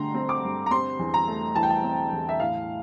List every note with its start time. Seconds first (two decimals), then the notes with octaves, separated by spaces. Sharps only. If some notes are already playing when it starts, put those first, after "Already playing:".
Already playing: G2 D3 A3 G5 A#5 C6
0.14 C4
0.29 D6
0.43 G2
0.66 A#5
0.71 C4 C6
0.99 E2
1.14 A#5
1.28 A3
1.55 E3 A5
1.63 G5
1.70 A5
1.84 C4
2.12 E2
2.29 E5
2.40 A2 F5